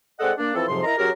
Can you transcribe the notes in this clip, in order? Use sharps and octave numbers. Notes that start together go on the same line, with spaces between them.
G#3 C4 A4 D5 D#5 F#5
A#3 D4
E3 F3 C4 E4 A4
F2 G#2 C3 F3 F#3 C6
E4 A#4 D#5 A#5
F#3 C#4 G4 G#4 A#4